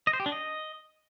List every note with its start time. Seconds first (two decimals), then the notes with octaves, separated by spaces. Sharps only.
0.07 D#5
0.13 C5
0.20 G4
0.26 D4
0.32 D#5